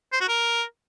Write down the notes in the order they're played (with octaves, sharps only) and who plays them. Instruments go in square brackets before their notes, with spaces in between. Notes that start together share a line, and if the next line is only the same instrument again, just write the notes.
[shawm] C5
F#4
A#4